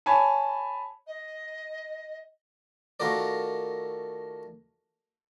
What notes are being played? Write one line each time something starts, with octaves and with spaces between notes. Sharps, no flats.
C#5 G#5 A5 B5
D#5
D#3 A3 F4 F#4 A#4 D5